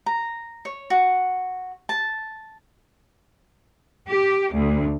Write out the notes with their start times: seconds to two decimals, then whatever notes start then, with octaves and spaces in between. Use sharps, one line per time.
0.06 A#5
0.65 C#5
0.90 F#4
1.89 A5
4.09 G4
4.53 D2